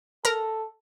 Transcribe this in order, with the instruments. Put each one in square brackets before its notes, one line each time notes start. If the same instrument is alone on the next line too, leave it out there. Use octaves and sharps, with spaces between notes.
[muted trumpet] A4 [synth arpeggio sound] A#4 A#5